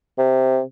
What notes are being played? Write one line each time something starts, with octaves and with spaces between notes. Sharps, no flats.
C3